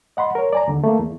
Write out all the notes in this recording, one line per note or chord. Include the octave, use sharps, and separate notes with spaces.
D#5 F#5 B5 C6
A#4 C#5
D5 G#5 A#5
D#2 D3
A3 A#3
E2